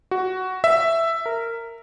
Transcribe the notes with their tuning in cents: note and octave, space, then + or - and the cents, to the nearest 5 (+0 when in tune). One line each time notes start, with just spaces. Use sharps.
F#4 +10
E5 +5
A#4 -15